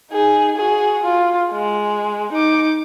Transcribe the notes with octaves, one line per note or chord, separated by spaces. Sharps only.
D#4 G#4
F#4 G#4
F4
G#3
D#4 D6